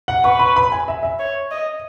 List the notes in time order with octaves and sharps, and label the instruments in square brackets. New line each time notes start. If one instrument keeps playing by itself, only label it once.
[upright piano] F#5
[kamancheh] B4 [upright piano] C#6
[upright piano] B5
B5
G#5
E5
E5
[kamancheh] C#5
D#5